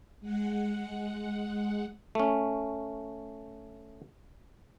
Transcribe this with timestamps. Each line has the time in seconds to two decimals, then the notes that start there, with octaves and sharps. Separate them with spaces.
0.21 G#3 F#5
2.15 A3 C#4